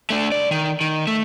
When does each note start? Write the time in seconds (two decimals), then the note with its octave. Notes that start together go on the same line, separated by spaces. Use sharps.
0.10 A3 D4
0.32 C2 D5
0.51 D#3
0.81 D#3
1.07 A3